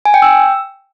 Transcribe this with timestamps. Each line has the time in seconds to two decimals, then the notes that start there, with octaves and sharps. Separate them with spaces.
0.05 G#5
0.14 G5
0.22 E6